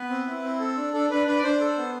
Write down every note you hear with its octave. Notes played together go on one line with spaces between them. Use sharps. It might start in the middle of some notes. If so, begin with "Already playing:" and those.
Already playing: B3 B4
C4
E4
C4
A4
D4
D4 A4
D4 B4
D4 B4
D5
D4 C5
A4
B3